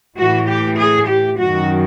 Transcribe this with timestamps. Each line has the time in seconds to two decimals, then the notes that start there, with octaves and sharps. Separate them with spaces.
0.18 A2 E3 F#4
0.48 G4
0.78 G#4
1.08 G4
1.38 F#2 D#3 F#4